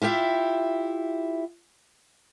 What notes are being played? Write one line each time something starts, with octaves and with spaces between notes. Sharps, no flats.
E4 F4 G4 E5